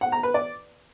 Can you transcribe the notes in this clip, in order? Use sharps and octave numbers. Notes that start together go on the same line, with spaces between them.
F#5
A#5
B4
D5